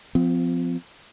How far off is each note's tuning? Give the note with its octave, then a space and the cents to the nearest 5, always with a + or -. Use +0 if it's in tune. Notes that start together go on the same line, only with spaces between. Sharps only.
F3 +0 C4 -35